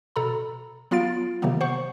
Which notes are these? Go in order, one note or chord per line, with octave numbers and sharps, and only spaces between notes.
B2 A4 A#5 B5
F#3 B3 F4 F5 A6 D7
C3 D#3 F#3 A#3 B3
C5 F#5 C#6